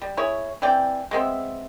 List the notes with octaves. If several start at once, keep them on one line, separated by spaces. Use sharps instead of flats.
G3
E4 G#4 C#5
E3 C4 D5 G5
G#3 B3 C4 E5